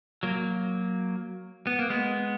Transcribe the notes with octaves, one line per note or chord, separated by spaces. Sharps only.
F#3 A#3
B3
A#3
G#3 B3